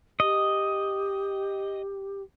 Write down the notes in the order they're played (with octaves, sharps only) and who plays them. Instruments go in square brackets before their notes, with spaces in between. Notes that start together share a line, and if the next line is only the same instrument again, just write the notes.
[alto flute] G4 [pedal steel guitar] D#5